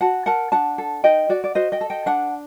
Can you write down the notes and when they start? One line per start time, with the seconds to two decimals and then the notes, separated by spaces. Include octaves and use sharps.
0.01 F#4 F#5 A5
0.26 A#4 F#5 A5
0.52 D4 F#5 A5
0.78 A4
1.04 D#4 D#5 G5
1.29 F#4 D5 F#5
1.44 D5
1.55 F#4 C5 D#5
1.72 D#5 G5
1.81 A4
1.90 D#5 G5
2.06 D4 F#5 A5